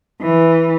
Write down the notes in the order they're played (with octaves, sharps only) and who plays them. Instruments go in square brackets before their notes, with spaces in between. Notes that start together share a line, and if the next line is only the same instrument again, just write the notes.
[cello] E3